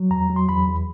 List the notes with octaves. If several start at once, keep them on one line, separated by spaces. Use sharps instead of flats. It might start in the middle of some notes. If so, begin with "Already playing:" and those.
Already playing: F#3
E2 A#5
F#3
C6
E2 B5
E2